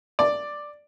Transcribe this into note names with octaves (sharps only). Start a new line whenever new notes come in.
D5